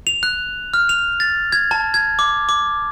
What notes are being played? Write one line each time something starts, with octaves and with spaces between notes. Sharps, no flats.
F7
F#6
F6
F7
A6
G#6
A5
G#6
D6
D6